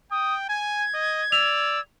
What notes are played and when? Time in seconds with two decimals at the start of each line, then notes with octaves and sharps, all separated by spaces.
0.11 G5 D#6
0.49 G#5 G#6
0.94 D#5
1.32 D5 E6 F7